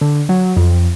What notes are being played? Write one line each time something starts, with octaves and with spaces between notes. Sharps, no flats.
D3
F#3
F2